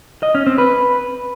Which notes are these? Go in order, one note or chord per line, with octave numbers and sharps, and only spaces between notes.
D#5
C#4
C4
B4